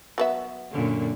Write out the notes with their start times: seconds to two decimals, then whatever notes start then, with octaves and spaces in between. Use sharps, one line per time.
0.18 F#3 B3 E5
0.72 F#2 A#2 D3